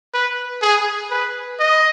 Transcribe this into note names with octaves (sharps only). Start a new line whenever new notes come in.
B4
G#4
B4
D#5